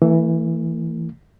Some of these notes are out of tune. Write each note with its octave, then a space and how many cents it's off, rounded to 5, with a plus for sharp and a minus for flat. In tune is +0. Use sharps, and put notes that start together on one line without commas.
E3 +0 A3 +40